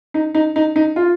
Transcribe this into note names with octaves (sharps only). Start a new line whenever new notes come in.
D#4
D#4
D#4
D#4
F4